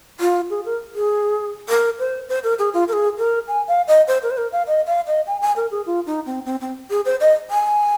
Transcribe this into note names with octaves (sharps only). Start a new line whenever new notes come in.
F4
G#4
A#4
G#4
A#4
C5
C5
A#4
G#4
F4
A#4
G#4
A#4
G#5
F5
D#5
C5
A#4
C5
A#4
F5
D#5
F5
D#5
G#5
G#5
A#4
G#4
F4
D#4
C4
C4
C4
G#4
C5
D#5
G#5